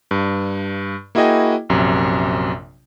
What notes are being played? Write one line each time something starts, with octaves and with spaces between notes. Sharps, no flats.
G2
A#3 E4 F#4 G#4 D#5 G5
A#1 F#2 C3